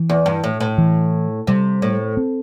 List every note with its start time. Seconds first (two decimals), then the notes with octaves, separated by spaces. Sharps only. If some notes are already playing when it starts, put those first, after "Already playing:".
Already playing: E3
0.09 E2
0.26 G2
0.44 A2
0.60 A2
0.78 E3
1.47 C3 G3
1.82 A2
2.17 C4